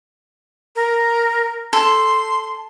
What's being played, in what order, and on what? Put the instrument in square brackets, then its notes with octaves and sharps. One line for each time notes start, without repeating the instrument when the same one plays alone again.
[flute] A#4
[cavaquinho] A4 [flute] C6